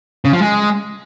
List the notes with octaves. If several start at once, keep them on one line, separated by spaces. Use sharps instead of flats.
C#3
F3
G#3